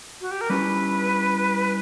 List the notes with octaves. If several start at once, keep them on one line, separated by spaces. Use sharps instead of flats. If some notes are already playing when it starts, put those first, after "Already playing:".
F#4
G4
A#4
G3 C#4 E4 G4 B4